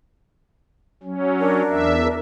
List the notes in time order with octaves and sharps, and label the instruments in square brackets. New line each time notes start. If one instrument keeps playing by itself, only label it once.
[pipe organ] F#3 C#4
[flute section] D4 A#4
[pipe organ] E2 E5